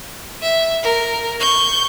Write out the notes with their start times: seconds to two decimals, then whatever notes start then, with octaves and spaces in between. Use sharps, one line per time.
0.42 E5
0.83 A#4
1.40 C#6 G6